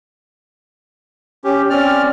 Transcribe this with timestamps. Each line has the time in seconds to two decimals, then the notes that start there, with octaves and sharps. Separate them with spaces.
1.44 C#4 G4
1.70 C4 C#4 D5 F6